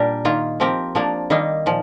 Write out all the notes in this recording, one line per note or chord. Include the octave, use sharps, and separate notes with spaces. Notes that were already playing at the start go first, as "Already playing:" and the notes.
Already playing: A#2 G3 D4 G4 A#4
D#3 A#3 F4
F3 C4 G4 A#4
F3 A#3 D4
D#3 G3 A#3 D#4
A#2 F3